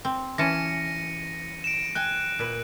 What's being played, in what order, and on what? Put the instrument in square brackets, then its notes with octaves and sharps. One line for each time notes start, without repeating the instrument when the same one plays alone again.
[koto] C4
[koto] E3 C#4 A5 [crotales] A#6 C#7 D#7
[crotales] D7 E7
[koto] G5 G#5 [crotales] F#6
[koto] A#2 B4